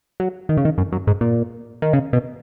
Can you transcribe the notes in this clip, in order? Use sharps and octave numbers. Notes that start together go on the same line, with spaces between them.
F#3
D#3
C#3
D#3
F#2
F#2
G#2
A#2
D#3
C#3
B2